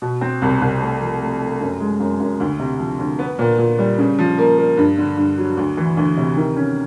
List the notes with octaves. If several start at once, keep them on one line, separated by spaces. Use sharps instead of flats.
B2
C4
C2
C2
A3
F3
A3
A3
F#2
G#3
F#2
F#2
D2
C3
F3
D2
B3
A#2
A#2
G3
C#3
F3
A#3
A#3
G2
D3
G2
F#3
D2
E3
D2
C3
D#3
C#4